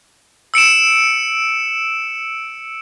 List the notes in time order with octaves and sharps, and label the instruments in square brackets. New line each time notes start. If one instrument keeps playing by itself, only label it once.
[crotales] E6 C#7 D7 E7